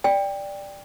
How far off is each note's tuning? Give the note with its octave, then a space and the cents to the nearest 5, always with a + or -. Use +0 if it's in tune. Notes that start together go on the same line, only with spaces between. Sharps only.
D5 +0 G5 +15